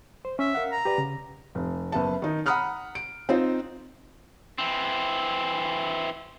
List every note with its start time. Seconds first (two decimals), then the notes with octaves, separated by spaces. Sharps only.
0.25 C5
0.39 C#4 E5
0.55 A#4 F5 F#5
0.71 A#5
0.85 G4 B4 D5
0.98 C#3
1.55 F1
1.92 F#1 B3 E5 A5
2.22 D#3 D#4
2.46 F#5 A#5 B5 D#6 F6 F#6
2.95 D7
3.29 C4 D#4 F4 C5
4.58 E3 C4